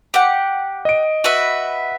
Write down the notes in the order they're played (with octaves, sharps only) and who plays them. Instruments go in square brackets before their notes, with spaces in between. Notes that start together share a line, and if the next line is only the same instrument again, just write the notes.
[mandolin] G4 F#5
[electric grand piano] D#5 D7
[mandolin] F#4 B4 E5